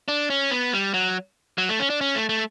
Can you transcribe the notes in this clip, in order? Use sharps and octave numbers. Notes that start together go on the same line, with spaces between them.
D4
C#4
B3
G3
F#3
F#3
A3
C#4
D4
C#4
A3
A3